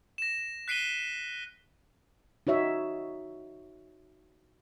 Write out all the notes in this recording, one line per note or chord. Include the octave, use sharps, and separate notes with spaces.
A#6 E7
F#6 B6 C7 D7 D#7 G7
D#4 F#4 C#5 E5